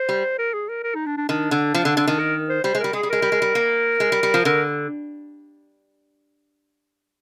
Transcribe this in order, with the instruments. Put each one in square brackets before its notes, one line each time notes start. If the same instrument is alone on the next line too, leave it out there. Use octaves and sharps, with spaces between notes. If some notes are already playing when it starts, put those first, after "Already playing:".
Already playing: [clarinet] C5
[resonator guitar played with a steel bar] G3
[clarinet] A#4
G#4
A#4
A#4
D#4
D4
D4
[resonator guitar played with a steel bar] D#3 [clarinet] D4
[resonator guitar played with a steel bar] D3
F3
D3
D3
D#3
[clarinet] A#4
C5
[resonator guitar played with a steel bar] G3 [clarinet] C5
[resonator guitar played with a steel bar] G#3
[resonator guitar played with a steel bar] G3 [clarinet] A#4
[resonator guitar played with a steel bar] G#3 [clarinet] G#4
[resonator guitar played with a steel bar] G3
[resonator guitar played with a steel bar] G#3 [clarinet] A#4
[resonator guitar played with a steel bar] G3
G#3
G3
A#3
G#3
G3
G3
F3
[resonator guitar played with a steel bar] D3 [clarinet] A#4